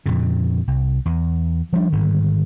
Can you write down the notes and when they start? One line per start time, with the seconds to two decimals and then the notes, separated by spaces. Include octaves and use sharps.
0.06 F2 A#2 C#3
0.68 C2
1.05 E2
1.73 F3 G3 A#3 D4
1.93 G#2 D3 D#3 G3